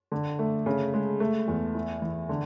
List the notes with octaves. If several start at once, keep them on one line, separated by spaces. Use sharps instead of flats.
D3
A3
C#3
G#3
A3
E2
E4
E3
D3